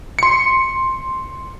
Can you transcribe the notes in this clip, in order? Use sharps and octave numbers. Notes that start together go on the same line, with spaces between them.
C6 C#7